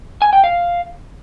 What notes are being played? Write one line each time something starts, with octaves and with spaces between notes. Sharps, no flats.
G#5
G5
F5